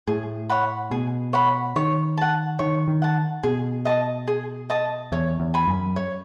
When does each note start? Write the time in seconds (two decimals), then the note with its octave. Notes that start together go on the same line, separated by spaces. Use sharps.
0.07 A2 G#4
0.49 C#5 F#5 B5
0.91 B2 G#4
1.33 C#5 F#5 B5
1.76 D#3 C#5
2.18 F#5 A5
2.59 D#3 C#5
2.88 D#3
3.02 F#5 A5
3.43 B2 G#4
3.85 D#5 A5 D#6
4.28 G#4
4.70 D#5 A5 D#6
5.12 E2 C#5
5.40 E2
5.54 G#5 B5
5.68 F#2
5.96 C#5